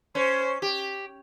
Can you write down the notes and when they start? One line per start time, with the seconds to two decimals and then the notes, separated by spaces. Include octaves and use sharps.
0.15 C#4 C5
0.62 G4